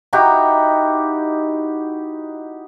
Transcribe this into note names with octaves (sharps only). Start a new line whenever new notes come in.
D#4 E4 F#4 G4